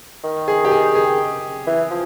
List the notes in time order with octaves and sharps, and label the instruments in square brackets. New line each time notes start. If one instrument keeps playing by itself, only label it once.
[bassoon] D#3
[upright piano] G#4
G4
G#4
G#4
[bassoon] E3
F3